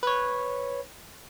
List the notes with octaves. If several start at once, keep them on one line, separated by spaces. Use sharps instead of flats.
B4 C#5